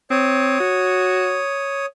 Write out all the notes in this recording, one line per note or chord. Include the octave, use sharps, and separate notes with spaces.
C4 C#5 D#6
F#4